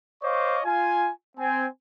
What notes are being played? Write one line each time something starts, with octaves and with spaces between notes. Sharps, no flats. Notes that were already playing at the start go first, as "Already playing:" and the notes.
C5 C#5 D#5 F5 C#6 D6
F4 G#5
C4 G#5